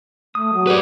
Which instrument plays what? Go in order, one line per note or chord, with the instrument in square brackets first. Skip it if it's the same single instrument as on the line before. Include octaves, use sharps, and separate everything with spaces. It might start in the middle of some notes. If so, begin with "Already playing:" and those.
[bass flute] A3 [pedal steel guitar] D#6
[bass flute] F#3
[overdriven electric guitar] B4 D5